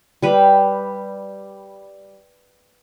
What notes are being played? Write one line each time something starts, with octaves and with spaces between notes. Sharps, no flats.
G3 B4